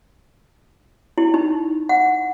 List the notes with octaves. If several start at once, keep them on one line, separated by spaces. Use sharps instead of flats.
E4
D#4
F#5